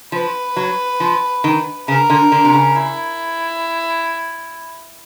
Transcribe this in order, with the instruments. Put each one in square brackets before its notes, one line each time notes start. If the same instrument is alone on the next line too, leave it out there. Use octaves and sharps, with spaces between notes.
[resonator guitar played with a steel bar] F3 [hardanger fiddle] B4
[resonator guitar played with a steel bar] F#3
F3
D#3
[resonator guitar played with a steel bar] C#3 [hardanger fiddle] A#4
[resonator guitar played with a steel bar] D3
D3
C3
C#3
[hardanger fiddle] E4